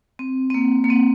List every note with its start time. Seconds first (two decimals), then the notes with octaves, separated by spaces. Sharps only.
0.19 C4
0.50 C4
0.54 A#3
0.84 A#3
0.90 C4